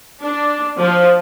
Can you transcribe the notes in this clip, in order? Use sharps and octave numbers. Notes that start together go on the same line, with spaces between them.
D4
F3